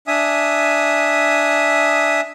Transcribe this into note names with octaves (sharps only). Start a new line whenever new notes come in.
D4 E5 G#5 D#6